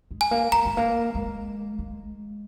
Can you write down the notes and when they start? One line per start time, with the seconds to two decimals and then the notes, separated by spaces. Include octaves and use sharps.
0.11 G#3
0.21 G#5
0.31 A#3
0.52 A#3 A#5
0.66 G#3
0.77 A#3
1.15 G#3
1.79 G#3